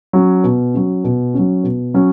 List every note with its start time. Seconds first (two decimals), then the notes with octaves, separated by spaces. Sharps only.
0.13 F#3 C#4
0.44 B2
0.74 F#3 C#4
1.04 B2
1.34 F#3 C#4
1.64 B2
1.94 F#3 C#4